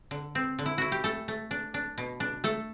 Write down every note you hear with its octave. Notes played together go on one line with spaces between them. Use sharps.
D3
C4
D3
E4
E4 F#4
G4
A3 A4
A3
D4
D4
B2
D4
A3 A4